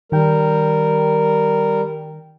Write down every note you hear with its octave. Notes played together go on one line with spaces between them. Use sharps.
D#3 G3 A#4 G5